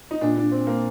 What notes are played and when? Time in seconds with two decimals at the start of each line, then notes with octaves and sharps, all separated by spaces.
0.11 D#4
0.21 A#2 D4
0.37 D4
0.52 C4
0.67 A#3